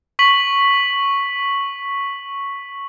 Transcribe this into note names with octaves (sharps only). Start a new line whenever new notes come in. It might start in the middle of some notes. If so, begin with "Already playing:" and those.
C#6 B6 F#7